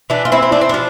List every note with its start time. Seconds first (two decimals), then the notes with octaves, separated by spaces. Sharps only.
0.10 E3 D4
0.25 F4
0.32 C4 E4
0.43 C4
0.52 D4
0.61 C4
0.69 F3 D4